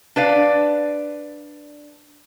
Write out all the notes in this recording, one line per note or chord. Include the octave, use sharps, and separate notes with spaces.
D4 B4 D5 F5